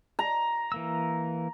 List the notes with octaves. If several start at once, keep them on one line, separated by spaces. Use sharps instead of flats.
A#5
E3 A#3 E6